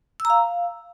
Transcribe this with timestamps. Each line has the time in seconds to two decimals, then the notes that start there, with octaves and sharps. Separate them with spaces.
0.20 E6
0.25 A#5
0.30 F5